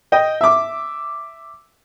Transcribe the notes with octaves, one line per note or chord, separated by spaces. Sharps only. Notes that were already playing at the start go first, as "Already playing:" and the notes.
D#5 G5
E5 D6